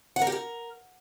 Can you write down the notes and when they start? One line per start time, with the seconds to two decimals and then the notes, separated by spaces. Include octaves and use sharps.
0.16 F#5
0.22 A#4
0.27 G4
0.32 A#4